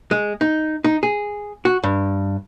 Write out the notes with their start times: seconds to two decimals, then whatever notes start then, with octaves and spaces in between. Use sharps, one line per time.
0.11 G#3
0.41 D#4
0.84 D#4
1.03 G#4
1.65 F#4
1.83 G2